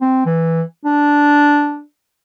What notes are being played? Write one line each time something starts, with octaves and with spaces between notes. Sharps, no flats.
C4
E3
D4